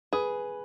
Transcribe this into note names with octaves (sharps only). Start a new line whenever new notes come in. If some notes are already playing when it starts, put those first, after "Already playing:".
G#4 B4